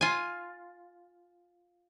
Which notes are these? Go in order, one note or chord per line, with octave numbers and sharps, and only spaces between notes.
F4 G#5